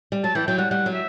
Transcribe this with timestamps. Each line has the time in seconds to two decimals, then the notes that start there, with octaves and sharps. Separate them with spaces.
0.12 G3
0.24 F#3 A5
0.35 E3 G5
0.47 F#3 G5
0.58 G3 F#5
0.71 G3 F#5
0.86 F#3
0.94 E5